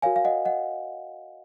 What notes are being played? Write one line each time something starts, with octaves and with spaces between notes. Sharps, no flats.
F#4 A#4 C#5 F5 G#5
F5
D#5 F#5
D#5 F#5